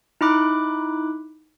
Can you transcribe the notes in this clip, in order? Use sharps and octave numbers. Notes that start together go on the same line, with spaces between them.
D#4 E4 B5 D6 F#6